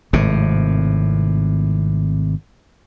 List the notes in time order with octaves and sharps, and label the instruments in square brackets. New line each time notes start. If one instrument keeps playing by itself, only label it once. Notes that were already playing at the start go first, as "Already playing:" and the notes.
[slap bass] G#1 A2 C3